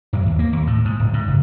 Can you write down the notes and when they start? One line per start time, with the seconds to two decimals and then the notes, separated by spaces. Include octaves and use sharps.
0.13 F#2
0.26 D#2
0.39 A#3
0.53 D#2
0.67 A2
0.85 G#2
1.00 D1
1.13 G#2
1.28 F#1